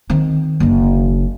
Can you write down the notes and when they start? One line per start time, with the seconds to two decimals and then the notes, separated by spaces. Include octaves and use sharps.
0.10 D#3 C4
0.60 F#1 D4